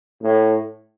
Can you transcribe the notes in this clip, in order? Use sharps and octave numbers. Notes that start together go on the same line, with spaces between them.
A2